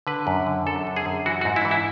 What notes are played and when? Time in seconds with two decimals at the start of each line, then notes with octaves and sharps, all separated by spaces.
0.07 D3 B4
0.27 F#2
0.46 D3
0.66 F#2 A4
0.87 D3
0.96 G#4
1.06 F#2
1.26 E3 F#4
1.41 F#4
1.45 G#2
1.56 E4
1.65 E3
1.71 E4